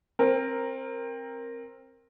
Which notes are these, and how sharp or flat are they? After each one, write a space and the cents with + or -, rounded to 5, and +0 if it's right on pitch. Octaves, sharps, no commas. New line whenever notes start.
C4 +20 A#4 +0